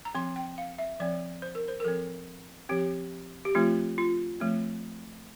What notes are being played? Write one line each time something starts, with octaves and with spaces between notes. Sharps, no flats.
A#5
F3 C4 C6
G5
F5
E5
F3 C4 D5
C5
A#4
C5
A#4
F3 C4 A4
F3 C4 G4
G4
F3 A3 C4 F4
F4
F3 A3 C4